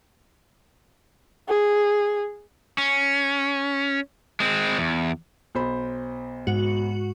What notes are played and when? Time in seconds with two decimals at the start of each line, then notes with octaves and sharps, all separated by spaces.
1.49 G#4
2.78 C#4
4.40 G#3 C4
4.78 E2
5.55 B1 C5 B5
6.47 G#2 F#4